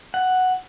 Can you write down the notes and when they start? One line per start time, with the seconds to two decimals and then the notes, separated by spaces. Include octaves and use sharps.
0.14 F#5